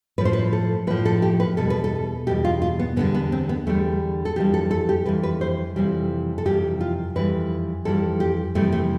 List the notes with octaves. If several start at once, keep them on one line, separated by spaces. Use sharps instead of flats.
A2 F3 B4
C5
B4
A4
A2 F3 B4
A4
G4
B4
E2 B2 G3 A4
B4
A4
E2 B2 G3 G4
F4
F4
B3
E2 D3 G3 B3
B3
C4
B3
E2 D3 G3 A3
A4
F2 E3 G3 G4
A4
A4
G4
F2 E3 G3 B4
B4
C5
F2 C3 E3 G3
A4
F2 C3 E3 G3 G4
F4
F2 E3 G3 B4
F2 E3 G3 A4
G4
F2 C3 E3 G3 A3
A3